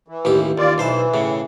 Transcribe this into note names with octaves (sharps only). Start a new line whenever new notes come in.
E3
A1 D#2 G4
D#2 F4 D5
B1 E3 C5 A5
A2 C#3